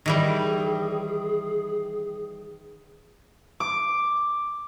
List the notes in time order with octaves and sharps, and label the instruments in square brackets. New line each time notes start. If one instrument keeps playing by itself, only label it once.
[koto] D#3 E3 G3 [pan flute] G#4
[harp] D6